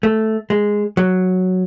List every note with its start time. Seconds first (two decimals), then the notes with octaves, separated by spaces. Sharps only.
0.03 A3
0.50 G#3
0.97 F#3